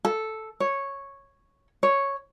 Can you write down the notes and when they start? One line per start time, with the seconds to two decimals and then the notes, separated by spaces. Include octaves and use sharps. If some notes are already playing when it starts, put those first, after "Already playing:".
0.05 A4
0.60 C#5
1.83 C#5